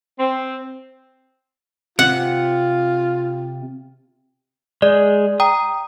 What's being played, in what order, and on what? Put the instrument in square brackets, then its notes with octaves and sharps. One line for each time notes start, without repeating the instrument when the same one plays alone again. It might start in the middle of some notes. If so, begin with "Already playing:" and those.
[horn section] C4
[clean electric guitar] C3 [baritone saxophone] F4 [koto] F#5
[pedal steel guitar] G#3 G#4 [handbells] D5
[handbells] G5 A#5 [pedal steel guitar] D#6